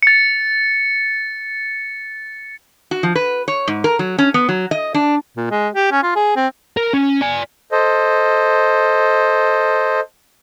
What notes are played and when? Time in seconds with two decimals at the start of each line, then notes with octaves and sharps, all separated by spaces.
0.03 A6 C#7
2.91 F#4
3.03 F3
3.15 B4
3.48 C#5
3.68 G#2
3.84 A#4
3.99 F#3
4.18 C#4
4.34 B3
4.49 F#3
4.71 D#5
4.94 D4
5.37 A#2
5.50 G#3
5.73 G4
5.91 C#4
6.03 F4
6.15 G#4
6.36 C4
6.77 A#4
6.93 C#4
7.21 D5 G#5
7.72 A4 C5 D#5